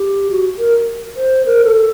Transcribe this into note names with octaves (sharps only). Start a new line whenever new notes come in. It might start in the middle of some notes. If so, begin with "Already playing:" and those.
Already playing: G4
F#4
A#4
C5
A#4
A4